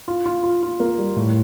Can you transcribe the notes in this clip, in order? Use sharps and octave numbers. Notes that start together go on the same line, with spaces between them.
F4
F4
F4
F4
A#3
G3
A2